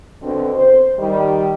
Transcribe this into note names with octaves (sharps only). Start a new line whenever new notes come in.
B2 D3 C4
C5
D#3 G3